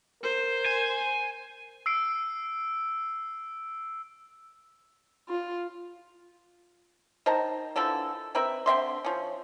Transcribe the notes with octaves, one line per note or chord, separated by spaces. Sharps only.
A#4 C5
G#5
E6 C7 D7
F4
D#3 C5 A5 A#5
D3 E3 F3 A4
C4 A#4 B4 E5
D3 C4 E5 C6
F3 C#4